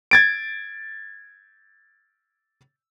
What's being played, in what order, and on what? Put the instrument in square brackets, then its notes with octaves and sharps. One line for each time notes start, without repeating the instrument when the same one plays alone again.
[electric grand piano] G#6 A6 D7